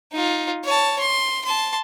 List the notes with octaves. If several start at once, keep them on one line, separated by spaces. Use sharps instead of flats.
D#4 F4
C#5 A5
C6
A5 C6